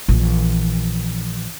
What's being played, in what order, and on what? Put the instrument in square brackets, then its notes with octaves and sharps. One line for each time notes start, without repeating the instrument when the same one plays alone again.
[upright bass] A#1 E3